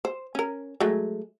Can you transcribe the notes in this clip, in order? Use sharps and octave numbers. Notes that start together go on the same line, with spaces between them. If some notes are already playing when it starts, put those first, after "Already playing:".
C5
C#4 A#4
F#3 G#3 A3